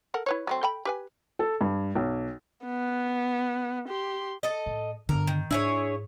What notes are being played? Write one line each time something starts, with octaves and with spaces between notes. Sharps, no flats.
A4 A#4 F#5
E4 B4 C#5
F#3 A3 C4
A4 G5 B5
G4 B4 G#5
A4
G2
B1
B3
G4 C6
A4 D#5
A2
G2 D3 B3 A#4
D#3
G#2 D4 E4 G#4 C#5